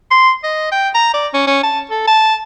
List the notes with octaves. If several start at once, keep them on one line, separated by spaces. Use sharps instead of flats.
C6
D#5
G5
A#5
D5
C#4
C#4
A5
A4
A5